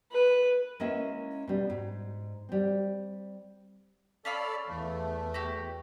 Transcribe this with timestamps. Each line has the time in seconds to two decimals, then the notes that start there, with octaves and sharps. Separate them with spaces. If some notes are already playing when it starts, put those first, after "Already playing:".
0.12 B4
0.80 G#3 A#3 C#4 E4 D#5 E5
1.48 B2 G3
1.70 G#2
2.49 G3 C4
4.25 C#4 A4 D5 F5 B5
4.68 E2 A3
5.34 F#4 G4